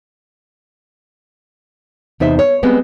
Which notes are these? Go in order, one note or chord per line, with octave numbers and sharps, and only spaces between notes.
E2 C3 D#4 C5 E5
C#5
G3 G#3 B3 C4